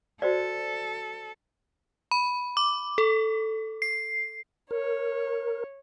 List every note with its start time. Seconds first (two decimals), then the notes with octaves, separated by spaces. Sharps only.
0.22 F#4 A4 C5 D5
2.11 B5
2.57 D6
2.98 A4
3.82 C7
4.71 A#4 C#5